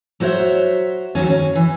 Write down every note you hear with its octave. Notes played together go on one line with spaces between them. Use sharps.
F#3 F#4 C5 C#5 E5
D#2 D#3 F#3 C#4
C#4
E3